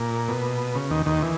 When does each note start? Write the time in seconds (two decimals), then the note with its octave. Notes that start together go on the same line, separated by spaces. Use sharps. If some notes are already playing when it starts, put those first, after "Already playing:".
Already playing: A#2
0.29 B2
0.75 C#3
0.90 D#2 D#3
1.06 D#2 D#3
1.22 E3